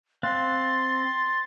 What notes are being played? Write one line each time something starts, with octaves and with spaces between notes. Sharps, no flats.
C4 F5 C6 F#6 A6